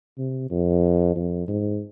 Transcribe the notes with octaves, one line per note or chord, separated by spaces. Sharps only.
C3
F2
F2
G#2